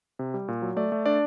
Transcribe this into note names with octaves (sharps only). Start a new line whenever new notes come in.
C3
G3
A#2
F#3
A3 D5
A3
D4 D5